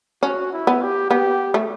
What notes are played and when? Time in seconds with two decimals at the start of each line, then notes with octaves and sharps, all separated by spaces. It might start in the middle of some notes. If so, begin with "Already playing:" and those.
0.23 C#4 F#4
0.52 E4
0.67 B3
0.82 G4
1.10 B3 G4
1.54 A3